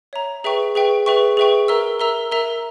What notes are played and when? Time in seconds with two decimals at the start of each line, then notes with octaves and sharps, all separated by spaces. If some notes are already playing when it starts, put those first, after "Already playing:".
0.13 C#5 E5 A#5
0.44 G#4 B4 E5 G5 C#6
0.75 G#4 B4 E5 G5 C#6
1.06 G#4 B4 E5 G5 C#6
1.37 G#4 B4 E5 G5 C#6
1.68 A#4 E5 A#5 E6
1.99 A#4 E5 A#5 E6
2.31 A#4 E5 A#5 E6